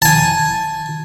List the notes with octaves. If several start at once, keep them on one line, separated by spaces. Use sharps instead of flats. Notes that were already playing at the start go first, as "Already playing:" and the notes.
G#5 A5